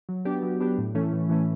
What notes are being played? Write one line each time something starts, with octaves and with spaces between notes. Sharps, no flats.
F#3
B3 D4 G4
F#3
B3 D4 G4
A2
E3 A3 C#4
A2
E3 A3 C#4